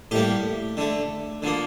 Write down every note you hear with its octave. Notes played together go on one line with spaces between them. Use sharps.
A2 G3 A#3 G4
D3 A3
D3 F3 A#3